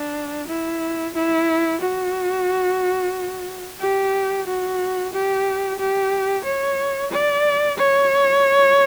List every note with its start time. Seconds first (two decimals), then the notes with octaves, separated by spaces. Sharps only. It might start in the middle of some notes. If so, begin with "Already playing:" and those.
Already playing: D4
0.47 E4
1.14 E4
1.81 F#4
3.80 G4
4.47 F#4
5.13 G4
5.79 G4
6.45 C#5
7.12 D5
7.77 C#5